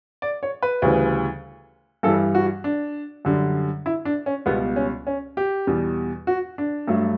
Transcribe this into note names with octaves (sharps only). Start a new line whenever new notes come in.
D5
C#5
B4
D2 C#3 E3 G3
G2 E3 G3 A4
F#4
D4
F#2 D3 G3
E4
D4
C#4
C#2 B2 G3 B3
C#4
C#4
G4
E2 B2 G3
F#4
D4
G2 F#3 A3